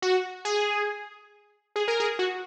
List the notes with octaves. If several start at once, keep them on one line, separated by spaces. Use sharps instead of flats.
F#4
G#4
G#4
A#4
G#4
F#4